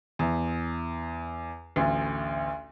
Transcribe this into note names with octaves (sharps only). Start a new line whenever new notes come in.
E2
A1 D2